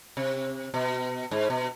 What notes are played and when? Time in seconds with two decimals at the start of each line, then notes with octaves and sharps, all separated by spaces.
0.17 C3
0.74 B2
1.31 G#2
1.50 B2